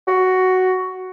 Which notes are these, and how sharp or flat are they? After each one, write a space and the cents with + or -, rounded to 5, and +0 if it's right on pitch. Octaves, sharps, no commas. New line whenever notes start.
F#4 +5